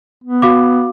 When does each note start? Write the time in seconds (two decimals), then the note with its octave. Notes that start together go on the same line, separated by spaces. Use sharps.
0.24 B3
0.42 F#4 F5 D6